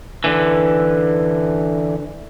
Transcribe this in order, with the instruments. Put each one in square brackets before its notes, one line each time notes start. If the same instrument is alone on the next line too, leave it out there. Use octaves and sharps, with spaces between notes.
[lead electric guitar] D3 E3